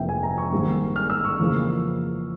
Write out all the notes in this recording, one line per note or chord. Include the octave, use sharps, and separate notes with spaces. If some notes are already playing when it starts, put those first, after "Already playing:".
Already playing: F1 F2 C3 E3 A#3 E5 G5
G#5
A#5
C#6
G#1 G#2 G3 A#3
F6
E6
C#6
F2 C#3 E3 A#3